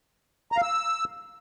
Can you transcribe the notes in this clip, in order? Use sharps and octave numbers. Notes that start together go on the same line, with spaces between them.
A#5
F5
E6